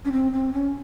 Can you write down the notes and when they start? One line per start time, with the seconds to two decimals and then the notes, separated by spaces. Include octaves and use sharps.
0.05 C#4
0.12 C4
0.33 C4
0.53 C#4